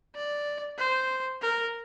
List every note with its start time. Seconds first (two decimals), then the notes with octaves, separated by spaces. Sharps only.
0.16 D5
0.79 C5
1.42 A#4